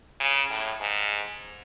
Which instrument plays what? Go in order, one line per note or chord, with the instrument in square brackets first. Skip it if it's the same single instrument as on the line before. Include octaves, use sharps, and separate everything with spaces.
[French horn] C#3
A2
G#2